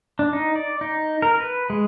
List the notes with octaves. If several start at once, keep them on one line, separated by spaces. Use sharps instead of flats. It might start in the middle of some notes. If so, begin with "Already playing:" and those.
D4
D#4
D5
D#4
A#4
B4
G#3